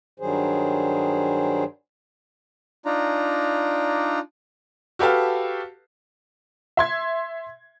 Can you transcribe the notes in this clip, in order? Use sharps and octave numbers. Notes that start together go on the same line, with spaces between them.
G2 D#3 F#3 G3 G#4 C5
D4 D#4 F4 D5 A#5
F#4 G4 A4 B4 F5 A5
E5 C6 G#6